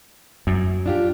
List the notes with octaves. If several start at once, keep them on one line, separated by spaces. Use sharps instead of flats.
F#2
D4 F4 G4